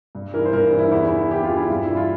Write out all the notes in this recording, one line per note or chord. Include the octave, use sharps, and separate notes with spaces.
G2
E3 A#4
C5
G2 A#4
E3
E4
E2 E4
E3
E2 G4
F4
E3
E4
G2 F4
E4
E3
F4